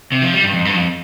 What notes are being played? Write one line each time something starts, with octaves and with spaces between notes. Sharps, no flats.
C3
F3
G3
G2
F2
G2
F2